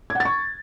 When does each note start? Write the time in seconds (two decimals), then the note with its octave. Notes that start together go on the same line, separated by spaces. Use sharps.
0.10 G#6
0.15 F#5
0.20 A6
0.25 C#6